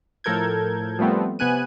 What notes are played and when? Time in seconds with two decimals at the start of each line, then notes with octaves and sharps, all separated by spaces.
0.24 A2 F3 A4 A#4 G6 G#6
0.99 F3 G3 A3 B3 C4
1.39 C3 B3 G#5 F#6 D#7